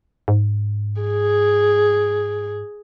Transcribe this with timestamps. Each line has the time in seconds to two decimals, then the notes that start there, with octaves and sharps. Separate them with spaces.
0.28 G#2
1.01 G#4